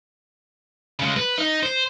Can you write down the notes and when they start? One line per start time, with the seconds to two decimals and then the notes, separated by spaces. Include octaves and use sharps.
0.99 C#3 G#3
1.17 B4
1.38 D#4
1.63 C5